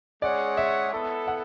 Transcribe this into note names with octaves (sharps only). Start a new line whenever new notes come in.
G#3 C#4 G#4 C#5 D5 F#5
E5
B3 E4 A4
F#5